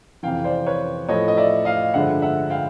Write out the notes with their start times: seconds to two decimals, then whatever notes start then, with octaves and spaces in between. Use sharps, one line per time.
0.23 F2 C3 E3 F5 G5
0.44 C5 D5
0.66 B4 C#5
1.08 A2 F3 A3 C#5 D#5
1.28 D#5
1.37 D5 E5
1.65 D#5 F5
1.94 G2 D3 F3 G#3 E5 F#5
2.22 E5 F#5
2.50 F5 G5